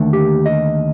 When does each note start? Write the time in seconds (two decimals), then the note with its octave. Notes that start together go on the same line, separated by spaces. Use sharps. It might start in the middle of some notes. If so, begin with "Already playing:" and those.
Already playing: D#2 D3 A3
0.13 G4
0.46 D#5